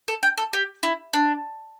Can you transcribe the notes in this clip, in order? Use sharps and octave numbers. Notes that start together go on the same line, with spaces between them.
A4
G5
A4
G4
E4
D4